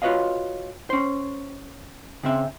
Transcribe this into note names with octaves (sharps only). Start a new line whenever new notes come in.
F4 F#4 B4 C#5 D#5 F5
C#4 C5
C#3 C4 E5